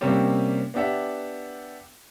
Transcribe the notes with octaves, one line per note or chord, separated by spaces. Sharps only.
C3 G3 A#3 C4 C#4 G4
B3 D4 G4 E5 F#5